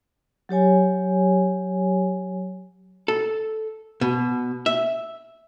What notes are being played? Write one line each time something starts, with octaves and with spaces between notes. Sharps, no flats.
F#3 G4 C#5 G#5
A4
B2
E5